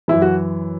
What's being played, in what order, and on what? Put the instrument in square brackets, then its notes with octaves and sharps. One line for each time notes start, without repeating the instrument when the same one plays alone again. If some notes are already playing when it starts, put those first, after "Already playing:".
[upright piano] F#2 E3 E4
F#4